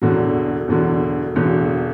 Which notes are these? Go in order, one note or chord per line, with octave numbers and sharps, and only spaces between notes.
E1 E2 D3 F#3
E1 E2 D3 F#3
E1 E2 D3 F#3